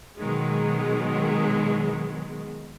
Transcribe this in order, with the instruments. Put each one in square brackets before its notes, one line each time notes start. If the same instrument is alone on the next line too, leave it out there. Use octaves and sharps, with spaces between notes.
[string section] B2 D#3 F#3 G#3